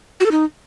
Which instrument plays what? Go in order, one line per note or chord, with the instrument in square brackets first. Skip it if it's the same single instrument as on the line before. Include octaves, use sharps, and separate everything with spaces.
[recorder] F#4
A4
D#4